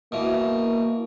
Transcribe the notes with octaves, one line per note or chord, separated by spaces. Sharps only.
B2 E3 A#3